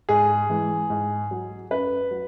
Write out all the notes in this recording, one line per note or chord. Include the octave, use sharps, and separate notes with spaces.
G#2 G#4
E3 G#3
G#2
F#3
F#2 B4
F#3